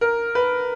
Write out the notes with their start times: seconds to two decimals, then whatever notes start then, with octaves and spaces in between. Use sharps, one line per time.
0.01 A#4
0.35 B4